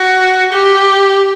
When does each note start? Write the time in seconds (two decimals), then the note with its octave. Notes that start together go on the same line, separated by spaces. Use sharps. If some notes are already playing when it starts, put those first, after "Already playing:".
Already playing: F#4
0.52 G4